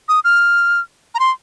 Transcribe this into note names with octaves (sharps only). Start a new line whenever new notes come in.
D#6
F6
A#5
C6